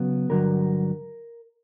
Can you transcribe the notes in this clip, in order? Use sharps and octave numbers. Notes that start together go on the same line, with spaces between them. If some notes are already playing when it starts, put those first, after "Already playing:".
Already playing: C#3 F#3 B3
G2 D3 F#3 A#4